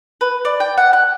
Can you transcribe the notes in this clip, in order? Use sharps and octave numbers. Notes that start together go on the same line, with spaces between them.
B4
D5
G5
F#5
F#6